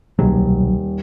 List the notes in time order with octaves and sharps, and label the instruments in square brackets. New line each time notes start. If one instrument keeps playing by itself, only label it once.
[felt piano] D#1 [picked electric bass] C2 B2 F#3